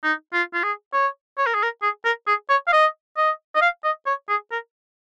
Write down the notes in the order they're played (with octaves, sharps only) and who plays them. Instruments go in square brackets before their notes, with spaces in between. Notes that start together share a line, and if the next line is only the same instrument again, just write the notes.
[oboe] D#4
F4
F4
G#4
C#5
C#5
A#4
G#4
A#4
G#4
A#4
G#4
C#5
F5
D#5
D#5
D#5
F5
D#5
C#5
G#4
A#4